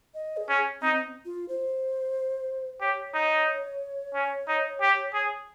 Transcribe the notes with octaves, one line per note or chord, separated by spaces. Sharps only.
D#5
G#4
C#4
C4 D#4
F4
C5
G4 C#5
D#4
C#4
D#4
G4
G#4